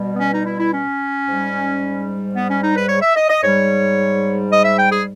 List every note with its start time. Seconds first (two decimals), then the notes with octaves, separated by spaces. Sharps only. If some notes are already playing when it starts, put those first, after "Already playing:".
Already playing: B2 G3
0.14 B3
0.19 C#4
0.33 D#4
0.46 E4
0.60 E4
0.72 C#4
1.27 G#2 G3
2.35 B3
2.49 C#4
2.63 D#4
2.76 B4
2.89 C#5
3.02 E5
3.16 D#5
3.29 D#5
3.43 G#2 G3 C#5
4.51 D#5
4.64 E5
4.78 G5
4.91 G#4